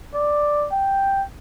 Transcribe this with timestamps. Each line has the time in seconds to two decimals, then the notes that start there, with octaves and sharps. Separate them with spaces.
0.15 D5
0.72 G5